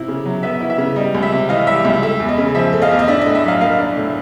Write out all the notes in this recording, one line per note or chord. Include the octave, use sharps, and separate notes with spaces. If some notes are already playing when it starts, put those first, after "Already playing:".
Already playing: C3 E4
C#3
F#3
B3 E5
E4
E5
C#3
G3 D#5
C#2
E5
C3
E3 D#5 F5
G3 E5
C#2 E5
A3 E5
E2
D#5
C#3
F3 E5
A3
D#5 F5
E2
D#5
D4 E5
A2 D#5
E5
F#3 D#5 F5
A#3 D#5 F5
D4
A2